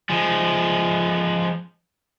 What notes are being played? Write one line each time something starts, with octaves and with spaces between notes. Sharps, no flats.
F3 G#3